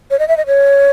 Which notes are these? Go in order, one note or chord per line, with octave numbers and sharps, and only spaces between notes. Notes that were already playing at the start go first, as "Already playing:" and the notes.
C#5
D#5
E5
D#5
C#5